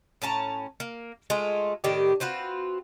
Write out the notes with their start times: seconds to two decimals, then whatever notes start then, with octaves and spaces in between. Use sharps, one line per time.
0.22 A2 C#4 A5 A#5
0.80 A#3
1.30 G#3 A3 F4
1.84 A2 D#3 D4 G4
2.20 C4 F4 F#4 B4